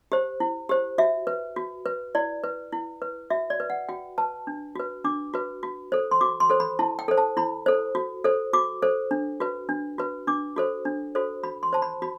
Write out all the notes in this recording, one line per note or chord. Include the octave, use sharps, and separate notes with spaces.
G4 C5
E4
G4 C5
F#4 E5
B4
F#4
B4
E4 D5
B4
E4
B4
F#4 E5
D5
B4
F#5
F#4 G5
B4 A5
D4
F#4 B4
D4 D6
F#4 B4
F#4
A4 C5
C6
F#4 D6
C6
A4 C5
B5
E4 A5
G5
A4 C5
A5
E4 B5
A4 C5
F#4
A4 C5
F#4 D6
A4 C5
D4
F#4 B4
D4
F#4 B4
D4 D6
F#4 A4 C5
D4
F#4 A4 C5
F#4 B5
C6
C5 A5
B5
F#4 B5